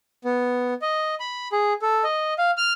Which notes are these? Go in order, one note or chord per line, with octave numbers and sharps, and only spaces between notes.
B3
D#5
B5
G#4
A4
D#5
F5
F6